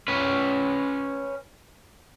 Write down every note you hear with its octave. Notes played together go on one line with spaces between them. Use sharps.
C#4 B4